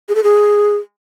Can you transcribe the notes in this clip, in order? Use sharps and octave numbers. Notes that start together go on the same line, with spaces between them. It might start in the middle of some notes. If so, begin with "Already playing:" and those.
G#4
A4
G#4